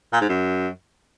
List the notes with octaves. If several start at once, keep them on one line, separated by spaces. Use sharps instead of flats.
A#2
G#2
F#2